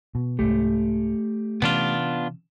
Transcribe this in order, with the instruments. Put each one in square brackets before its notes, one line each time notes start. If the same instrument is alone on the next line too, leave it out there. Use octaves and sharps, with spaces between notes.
[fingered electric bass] B2
[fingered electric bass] C2 G#2 [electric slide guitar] A3 G4 A4
[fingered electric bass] C3 E3 C#4 [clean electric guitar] B3 D4 F4